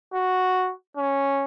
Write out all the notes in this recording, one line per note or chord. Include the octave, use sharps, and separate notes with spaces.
F#4
C#4